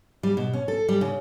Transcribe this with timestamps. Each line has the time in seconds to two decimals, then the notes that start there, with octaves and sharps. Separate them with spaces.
0.23 G3
0.37 B2
0.53 C#4
0.68 A4
0.89 G3
1.01 C#3